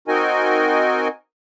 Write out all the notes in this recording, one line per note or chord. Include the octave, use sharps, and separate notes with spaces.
C4 D#4 F#4 A#4 D#5 G#5